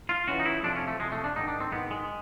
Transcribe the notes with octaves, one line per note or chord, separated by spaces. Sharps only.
F4
C#2 C#3 E3 F#4
D#4
E4
F2 C3 F3 D4
C#4
A3
F2 C3 F3 G#3
A3
D4
G#2 D#3 D#4
D4
C4
G#2 D#3 B3
G#3